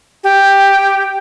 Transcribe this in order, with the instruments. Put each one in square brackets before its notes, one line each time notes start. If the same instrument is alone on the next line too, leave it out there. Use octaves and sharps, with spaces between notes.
[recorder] G4